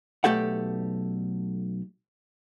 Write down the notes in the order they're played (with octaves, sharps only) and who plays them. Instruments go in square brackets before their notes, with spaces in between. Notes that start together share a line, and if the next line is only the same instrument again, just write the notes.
[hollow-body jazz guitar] B1 B2 A3 G4 A4 F#5